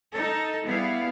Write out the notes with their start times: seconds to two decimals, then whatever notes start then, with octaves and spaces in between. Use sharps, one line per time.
0.13 D#4 A4
0.66 G3 B3 E4 G#4 F5